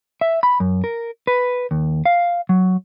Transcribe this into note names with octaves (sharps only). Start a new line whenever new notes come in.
E5
B5
F#2
A#4
B4
D#2
F5
F#3